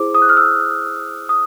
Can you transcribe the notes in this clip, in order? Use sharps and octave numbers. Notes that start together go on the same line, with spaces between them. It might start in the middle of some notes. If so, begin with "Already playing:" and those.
Already playing: E4 G#4 C5 D6
D#6
F#6
F6
E6
D#6